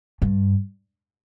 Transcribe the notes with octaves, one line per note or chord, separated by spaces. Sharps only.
G2